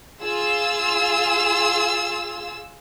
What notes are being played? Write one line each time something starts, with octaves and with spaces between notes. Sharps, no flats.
F4 G#4 F5 E6